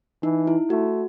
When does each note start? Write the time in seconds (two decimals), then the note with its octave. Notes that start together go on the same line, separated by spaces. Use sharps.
0.23 E3 D#4
0.47 E4
0.70 A3 F#4